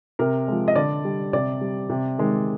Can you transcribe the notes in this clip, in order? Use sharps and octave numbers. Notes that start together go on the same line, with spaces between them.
C3 A#4
F3 G#3
D#5
D3 D5
G3
C3 D5
G3
C3
D#3 G#3